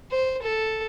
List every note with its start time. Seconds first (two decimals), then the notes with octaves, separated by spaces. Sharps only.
0.11 C5
0.43 A4